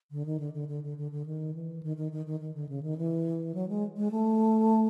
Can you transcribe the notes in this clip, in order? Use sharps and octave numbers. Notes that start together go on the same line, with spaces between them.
D3
D#3
D3
D3
D3
D3
D3
D3
D#3
E3
D#3
D#3
D#3
D#3
D#3
D3
C#3
D#3
E3
F#3
G#3
G#3
A3